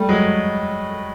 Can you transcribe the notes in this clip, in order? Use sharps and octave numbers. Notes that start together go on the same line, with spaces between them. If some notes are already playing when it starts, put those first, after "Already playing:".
Already playing: G3 A3
F#3 G#3